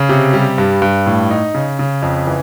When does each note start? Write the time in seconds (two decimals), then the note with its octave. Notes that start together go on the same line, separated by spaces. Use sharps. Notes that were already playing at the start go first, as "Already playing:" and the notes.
Already playing: C#3
0.09 C3
0.33 G3
0.58 G2
0.82 G2
1.06 A2
1.31 D#4
1.55 C#3
1.79 C#3
2.02 F2
2.27 E3